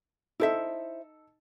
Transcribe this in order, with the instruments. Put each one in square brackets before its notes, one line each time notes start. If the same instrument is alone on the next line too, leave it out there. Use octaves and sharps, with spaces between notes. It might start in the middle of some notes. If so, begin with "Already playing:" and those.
[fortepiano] D#4 A4 [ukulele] E4 C5 E5